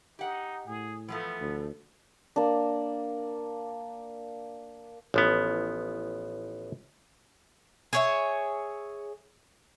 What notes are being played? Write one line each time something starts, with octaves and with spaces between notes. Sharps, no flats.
D#4 G4 F#5
A2 G#4
E3 F3 A3 B3
D2
A#3 D4
A1 F3 B3
G#4 C#5 E5